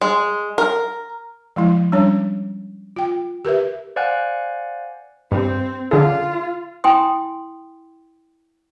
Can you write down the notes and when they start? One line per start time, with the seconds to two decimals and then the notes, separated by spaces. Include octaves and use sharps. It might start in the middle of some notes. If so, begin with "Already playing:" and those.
0.01 G#3
0.58 A#4
1.56 F3 G#3 E4
1.92 G3 C#4 D4 C#5
2.96 F4 G5
3.45 G4 A#4 B4 E5
3.96 C5 D5 F5 F#5 G#5 F#6
5.32 G2 C4
5.91 D3 C#4 F4 G#4
6.84 E4 G5 G#5 C6 D#6